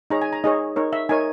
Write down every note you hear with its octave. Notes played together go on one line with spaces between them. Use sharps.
D#4 G#4 C#5 A#5
G#5
A#5
D#4 G#4 C#5 D#5
D#4 A#4 C#5
E5
D#4 A#4 C#5 G#5